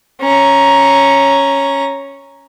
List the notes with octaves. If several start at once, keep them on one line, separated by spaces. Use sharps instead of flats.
C#4 A#5